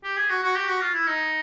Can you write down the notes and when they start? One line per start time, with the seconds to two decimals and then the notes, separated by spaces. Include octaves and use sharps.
0.04 G4
0.17 G#4
0.30 F#4
0.43 F#4
0.55 G4
0.68 F#4
0.81 F4
0.94 E4
1.07 D#4